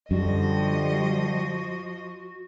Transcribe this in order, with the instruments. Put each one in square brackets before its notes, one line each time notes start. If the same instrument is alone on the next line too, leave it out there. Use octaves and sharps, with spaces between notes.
[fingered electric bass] F#2 [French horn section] D3 G3 [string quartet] F3 D#5 [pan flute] F#4